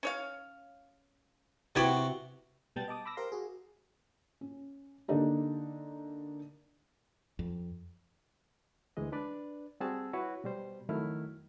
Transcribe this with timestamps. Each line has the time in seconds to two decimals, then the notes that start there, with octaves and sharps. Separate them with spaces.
0.03 C#4 C#5 F5
1.75 C3 B3 E4 F#4 G4 C#6
2.76 B2 G3 B3 G5 A5 A6
2.88 D#5 A5 D6 D#6
3.05 B5 D6 E6 A#6
3.17 G4 A#4 C5 F5 C6
3.32 F#4 G#4
4.41 C#4
5.08 D3 A#3 D4 D#4 G4
7.39 F2
8.97 D2 E3 G#3 D#5
9.12 D4 B4 D5
9.80 G3 C4 F#4 G#4 A5 E6
10.13 E4 F#4 B4 C#5
10.44 B2 G3 C5
10.89 F2 D#3 F#3 A3 E4 F6